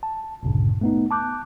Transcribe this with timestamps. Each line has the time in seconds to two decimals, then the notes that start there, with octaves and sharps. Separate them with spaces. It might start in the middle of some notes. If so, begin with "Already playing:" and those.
0.03 A5
0.43 G1 D2 G2 A#2 C#3
0.81 A3 B3 D#4
1.11 A5 D6 F#6 G6